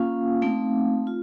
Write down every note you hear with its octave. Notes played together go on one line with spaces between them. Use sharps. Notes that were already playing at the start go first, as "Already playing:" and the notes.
Already playing: A#3 C#4 F4 F5
A3 C4 D#4
F4